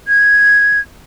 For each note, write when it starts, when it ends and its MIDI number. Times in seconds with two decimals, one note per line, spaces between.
0.08 0.79 92